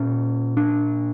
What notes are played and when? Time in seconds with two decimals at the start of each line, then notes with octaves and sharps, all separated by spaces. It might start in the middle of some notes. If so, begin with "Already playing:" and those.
Already playing: A#2 C#4
0.57 D4